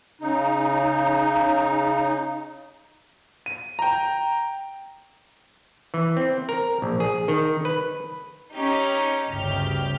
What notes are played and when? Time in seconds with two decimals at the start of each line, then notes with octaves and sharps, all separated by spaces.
0.21 C#3 D#4
3.46 D#7
3.79 G5 A#5
5.94 E3
6.17 C4
6.49 A#4
6.82 A#1
7.00 G#4
7.28 D#3
7.65 B4
8.53 C#4 D#4 G4
9.28 G1 D2 C#3 G4 F6